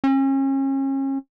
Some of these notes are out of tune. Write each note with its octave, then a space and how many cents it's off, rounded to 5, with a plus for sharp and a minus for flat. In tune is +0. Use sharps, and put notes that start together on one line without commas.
C#4 -35